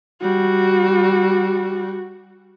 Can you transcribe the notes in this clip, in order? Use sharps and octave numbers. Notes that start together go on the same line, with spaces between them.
G3 F#4